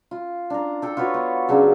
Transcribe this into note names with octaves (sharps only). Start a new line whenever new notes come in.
F4
D4 A#5
A4 G5
F4 F#4 B4 C#5
B3
C#3 F#3 D4